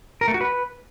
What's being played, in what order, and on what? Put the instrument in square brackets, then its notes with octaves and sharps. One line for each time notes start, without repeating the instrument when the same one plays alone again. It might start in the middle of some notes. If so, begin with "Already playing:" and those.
[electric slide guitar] A#4
A3
F#4
B4